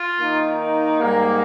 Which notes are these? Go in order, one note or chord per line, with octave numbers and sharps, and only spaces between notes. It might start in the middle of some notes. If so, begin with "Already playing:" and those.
Already playing: F4
D#3 A#3 D#4
G#2 G3 A#3